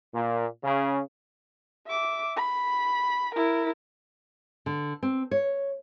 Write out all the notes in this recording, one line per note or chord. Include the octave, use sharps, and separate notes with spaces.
A#2
C#3
E5 D6
B5
E4 A#4
D3
C4
C#5